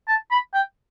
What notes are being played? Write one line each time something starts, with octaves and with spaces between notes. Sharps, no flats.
A5
B5
G5